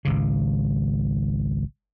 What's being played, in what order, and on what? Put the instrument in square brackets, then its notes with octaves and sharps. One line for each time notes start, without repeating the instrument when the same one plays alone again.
[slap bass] G#1 C#2 C#3